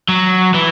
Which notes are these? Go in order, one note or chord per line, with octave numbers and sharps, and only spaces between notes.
F#3
E3